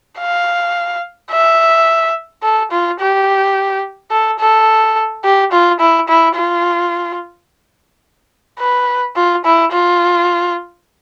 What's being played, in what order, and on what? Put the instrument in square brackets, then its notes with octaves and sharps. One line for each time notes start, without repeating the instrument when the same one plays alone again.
[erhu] F5
E5
A4
F4
G4
A4
A4
G4
F4
E4
E4
F4
B4
F4
E4
F4